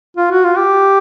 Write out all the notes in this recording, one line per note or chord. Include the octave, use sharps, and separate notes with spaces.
F4
F#4
F4
G4